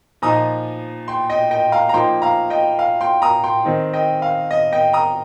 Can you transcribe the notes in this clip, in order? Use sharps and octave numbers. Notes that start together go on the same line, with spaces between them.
A#2 F3 D#4 A#5 D#6
G5 C6
D#5 G5
D#5 G5
F5 A#5
A#5
F3 A#3 D#4 G5 C6
F5 A#5
D#5 G5
F5
G5 C6
A#5 D#6
G5 C6
D#3 C4 D#4
D#5 G5
F5
D#5
D#5 G5
A#5 D#6